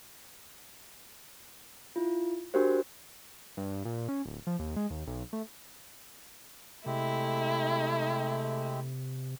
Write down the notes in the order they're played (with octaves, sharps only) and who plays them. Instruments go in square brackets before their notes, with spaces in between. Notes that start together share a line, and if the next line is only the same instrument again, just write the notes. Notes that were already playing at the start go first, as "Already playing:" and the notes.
[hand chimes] E4 F4
D4 F#4 G4 A#4 C5
[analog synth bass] G2
A#2
C#4
D1
F3
D#2
G#3
D#2
B1
A3
[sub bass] C3 [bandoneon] G#3 C4 G4 [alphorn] A3 [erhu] E4